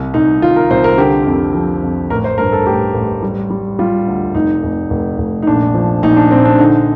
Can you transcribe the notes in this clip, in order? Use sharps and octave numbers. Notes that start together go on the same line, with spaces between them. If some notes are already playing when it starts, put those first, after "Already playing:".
Already playing: C2
C2 D#4
D#3 F4
A#4
C2 C5
A#4
D3 G4
F2
F3
F2
A1 A#4
C5
G2 A#4
A4
A1 G4
A1
G3
G3
G3 F4
D2
F1 D#4
F1
F1
F1
D#4
A#1 D4
F3
A#1 D#4
D4
A#1 C4
D4
D3 D#4